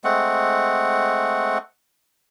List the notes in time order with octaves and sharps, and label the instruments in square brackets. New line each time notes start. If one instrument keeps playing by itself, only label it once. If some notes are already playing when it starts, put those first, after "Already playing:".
[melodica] G#3 A3 C4 F#5